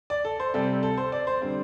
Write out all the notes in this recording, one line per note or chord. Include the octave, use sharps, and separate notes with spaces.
D5
A4
C5
C3 G3 C4 A4
A4
C5
D5
C5
D3 G3 C4